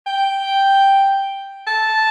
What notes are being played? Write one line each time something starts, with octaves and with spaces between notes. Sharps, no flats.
G5
A5